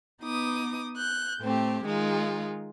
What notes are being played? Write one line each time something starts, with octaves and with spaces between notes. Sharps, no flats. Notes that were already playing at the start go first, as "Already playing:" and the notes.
B3 D#4 D6 D#6
F#6 G6
A2 A3 C4 G4
D#3 G#3 D#4 F4